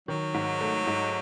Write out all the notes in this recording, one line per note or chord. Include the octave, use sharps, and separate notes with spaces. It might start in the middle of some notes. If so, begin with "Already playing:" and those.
D#3 F#3
G#2
A3
G#2